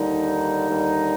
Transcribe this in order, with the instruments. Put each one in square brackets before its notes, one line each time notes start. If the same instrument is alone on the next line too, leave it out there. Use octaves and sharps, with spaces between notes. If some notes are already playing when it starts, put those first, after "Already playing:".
Already playing: [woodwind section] D#2 D3 G3 D#4
D#2 D3 G3